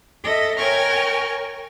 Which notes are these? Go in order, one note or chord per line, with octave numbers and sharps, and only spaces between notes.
A4 D#5 E5
A#4 C#5 G5 G#5 C#6 F6